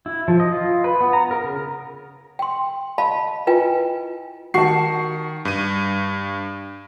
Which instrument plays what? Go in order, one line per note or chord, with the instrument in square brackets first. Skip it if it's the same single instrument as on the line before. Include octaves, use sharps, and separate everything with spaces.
[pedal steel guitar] E4
F3
D#5
F4
B4
B3
A#5
A#4
C#3
[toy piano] G5 C6
D#5 F5 A5 B5
E4 F4 B4 D#5 G5 G#5
[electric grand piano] D#3 C#6 C7 [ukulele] F#4 A5
[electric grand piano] G2 D#7